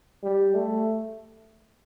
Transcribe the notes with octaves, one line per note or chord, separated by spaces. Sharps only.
G3
A3